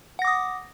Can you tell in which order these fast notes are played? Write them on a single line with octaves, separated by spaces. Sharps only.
F#5 A#6 D6 D#6